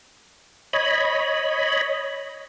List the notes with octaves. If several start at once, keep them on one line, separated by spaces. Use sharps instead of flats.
C#5 D#5 B5